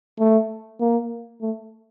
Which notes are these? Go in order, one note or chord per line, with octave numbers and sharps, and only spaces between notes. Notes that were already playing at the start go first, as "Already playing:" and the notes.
A3
A#3
A3